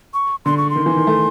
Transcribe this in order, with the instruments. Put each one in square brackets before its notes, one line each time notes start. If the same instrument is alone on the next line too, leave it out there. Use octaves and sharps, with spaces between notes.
[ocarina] C#6
[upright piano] D3 [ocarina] C6
[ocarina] C#6
C6
[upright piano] D#3
E3
D#3
A3